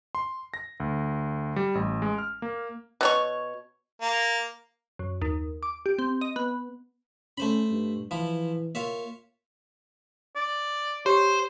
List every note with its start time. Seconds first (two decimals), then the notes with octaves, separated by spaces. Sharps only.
0.15 C6
0.54 A#6
0.80 D2
1.56 G3
1.75 A1
2.02 G#3
2.18 F6
2.42 A#3
3.01 B2 C#5 C#6
4.02 A#3
4.99 F#2
5.22 D#2
5.63 D6
5.86 G4
5.99 C4
6.21 D#5
6.36 B3
7.38 A3 C#4 C5 B5
7.71 G2
8.11 E3 F3 E4
8.75 A#3 F4 C#5 E5
10.36 D5
11.06 G4 C5 C#5